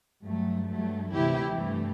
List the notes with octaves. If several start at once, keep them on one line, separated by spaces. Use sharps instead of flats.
G2 F#3 A3
G2 F#3 A3
D2 C3 E3 E4 G4
G2 E3 A3